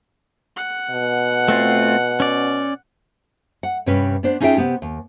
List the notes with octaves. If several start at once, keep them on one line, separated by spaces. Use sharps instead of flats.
F#5
B2
A3 C4 F4
C#4 D5
F#5
G2 C3 G3 C#4 B4
B3 D4 C5
C#4 D#4 F4 G#4 E5 G5
C3 B3 G4
D#2